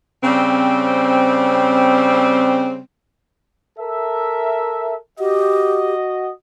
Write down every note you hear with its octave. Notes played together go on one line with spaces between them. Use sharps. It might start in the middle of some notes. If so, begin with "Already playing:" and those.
C#3 G3 C4
A4 A#4 E5
F#4 G4 D#5